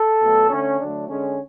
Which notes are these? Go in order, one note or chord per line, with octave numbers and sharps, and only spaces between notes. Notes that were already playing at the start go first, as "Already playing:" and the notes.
Already playing: A4
B2 F#3 A3
D3 A3 C#4
D3 F#3 A3 D4
D3 G#3 C#4